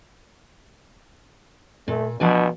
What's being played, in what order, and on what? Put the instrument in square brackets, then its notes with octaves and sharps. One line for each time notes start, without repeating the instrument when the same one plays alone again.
[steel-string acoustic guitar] A#2 [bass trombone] A3
[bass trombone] B2 [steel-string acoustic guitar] F3 D4 G#5